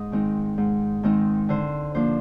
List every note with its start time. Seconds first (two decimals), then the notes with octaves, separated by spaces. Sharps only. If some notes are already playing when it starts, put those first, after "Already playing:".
Already playing: G#2 D#5
0.12 D#3 G#3 C4 D#4
0.58 G#2
1.03 D#3 G#3 C4 D#4
1.49 D3 C5
1.95 F3 A#3 D4 C5